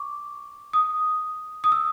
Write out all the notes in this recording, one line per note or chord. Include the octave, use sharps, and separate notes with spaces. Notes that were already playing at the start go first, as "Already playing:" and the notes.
Already playing: C#6 D6
D#6
D#6
E6